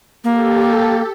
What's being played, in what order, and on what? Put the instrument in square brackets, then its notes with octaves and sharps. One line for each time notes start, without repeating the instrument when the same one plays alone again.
[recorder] A#3 [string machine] G4 A4